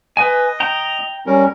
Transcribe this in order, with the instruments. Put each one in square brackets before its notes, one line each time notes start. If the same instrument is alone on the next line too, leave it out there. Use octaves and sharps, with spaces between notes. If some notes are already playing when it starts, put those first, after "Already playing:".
[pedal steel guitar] B4 G#5 [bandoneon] D#5
[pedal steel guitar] G5 A#5
[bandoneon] G3 C#4 A#4